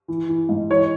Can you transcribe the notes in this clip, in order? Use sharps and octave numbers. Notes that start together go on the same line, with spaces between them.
E3
E3
G#2
E3 C#5